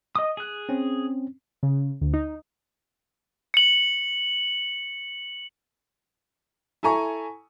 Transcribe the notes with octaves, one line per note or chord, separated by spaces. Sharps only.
D#5 D#6
G#4 F#6
C4 C#4
C#3
D2
D#4
C#7 F#7
E4 A4 G#5 A#5 C#6